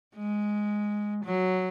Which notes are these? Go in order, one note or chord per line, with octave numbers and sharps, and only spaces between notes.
G#3
F#3